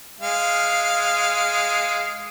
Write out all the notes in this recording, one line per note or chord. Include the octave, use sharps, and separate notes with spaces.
G#3 F5